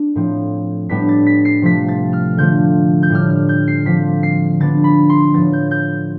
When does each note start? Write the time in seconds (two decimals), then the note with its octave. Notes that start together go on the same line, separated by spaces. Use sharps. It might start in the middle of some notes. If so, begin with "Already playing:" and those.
Already playing: D4
0.16 A2 F3 C4
0.89 A2 G3 B3 D4 B6
1.08 A6
1.26 B6
1.45 C7
1.62 C3 F3 A3 B6
1.88 A6
2.13 F6
2.37 D3 F3 A3 G6
3.03 G6
3.10 A2 G3 D4 F6
3.30 F6
3.49 G6
3.68 C7
3.85 D3 F3 C4 B6
4.23 C7
4.60 D3 F3 B3 D4 A6
4.84 B5
5.10 C6
5.34 A2 F3 B3 A6
5.53 G6
5.71 G6